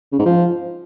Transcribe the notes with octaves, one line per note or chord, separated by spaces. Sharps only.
C#3
G#2
F3